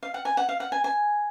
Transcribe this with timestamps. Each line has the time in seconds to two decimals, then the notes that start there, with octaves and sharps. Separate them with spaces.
0.03 F5
0.14 F#5
0.25 G#5
0.37 F#5
0.49 F5
0.60 F#5
0.72 G#5
0.84 G#5